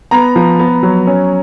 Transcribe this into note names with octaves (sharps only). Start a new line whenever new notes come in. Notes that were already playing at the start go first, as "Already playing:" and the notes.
B3 A#5
F3
B3
F#3
C#4